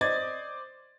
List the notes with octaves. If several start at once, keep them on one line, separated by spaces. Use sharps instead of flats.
C5 D5 D#5 G#6 A6